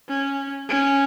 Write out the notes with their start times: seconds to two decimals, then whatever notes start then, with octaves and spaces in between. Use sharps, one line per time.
0.09 C#4
0.69 C#4